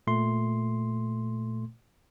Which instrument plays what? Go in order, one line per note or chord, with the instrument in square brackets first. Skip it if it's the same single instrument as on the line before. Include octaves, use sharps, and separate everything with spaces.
[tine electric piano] A#2 A3 C6